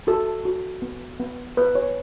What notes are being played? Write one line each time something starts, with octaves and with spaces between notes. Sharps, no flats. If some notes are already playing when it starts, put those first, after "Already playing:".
F#4 A4
F#4
B3
B3
B3 B4
C#5